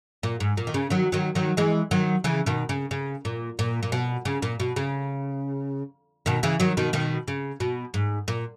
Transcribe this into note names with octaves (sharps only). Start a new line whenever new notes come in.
A#2
G#2
A#2
D#3
C#3
D#3 F#3
D#3 F#3
D#3 F#3
E3 G#3
D#3 F#3
C#3 E3
B2 D#3
C#3
C#3
A#2
A#2
A#2
B2
C#3
A#2
B2
C#3
B2 D#3
C#3 E3
D#3 F#3
B2 D#3
B2 D#3
C#3
B2
G#2
A#2